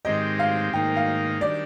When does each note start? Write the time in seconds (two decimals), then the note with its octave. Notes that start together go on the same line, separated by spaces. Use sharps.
0.05 G#2 D#3 G#3 C4 G4 D#5
0.39 F5
0.73 G#2 D#3 A#3 D#4 G5
0.96 F5
1.41 D#3 G3 D4 D5